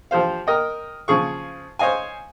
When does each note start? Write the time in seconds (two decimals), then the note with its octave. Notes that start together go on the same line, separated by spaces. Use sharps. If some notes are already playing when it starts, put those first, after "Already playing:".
0.11 F3 G4 C5 F5
0.47 A#4 D#5 G5
1.08 C#3 F3 G#4 C#6
1.79 C5 C#5 D#5 F5 G#5